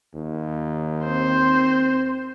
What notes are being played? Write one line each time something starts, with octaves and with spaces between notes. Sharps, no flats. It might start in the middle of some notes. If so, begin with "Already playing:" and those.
D#2
C4 C5